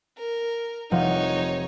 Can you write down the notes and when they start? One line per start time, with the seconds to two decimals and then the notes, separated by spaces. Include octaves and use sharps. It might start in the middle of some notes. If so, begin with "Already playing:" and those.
0.18 A#4
0.91 F1 F3 D#4 C#5 F#5